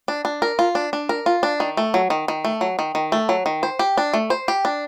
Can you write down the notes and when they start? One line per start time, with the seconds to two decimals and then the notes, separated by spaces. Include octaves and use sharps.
0.08 D4
0.25 D4
0.42 A#4
0.59 F4
0.75 D4
0.93 D4
1.09 A#4
1.26 F4
1.43 D4
1.60 D#3
1.77 A3
1.94 F#3
2.10 D#3
2.28 D#3
2.45 A3
2.61 F#3
2.79 D#3
2.95 D#3
3.12 A3
3.29 F#3
3.46 D#3
3.63 C5
3.79 G4
3.98 D4
4.14 A3
4.30 C5
4.48 G4
4.65 D4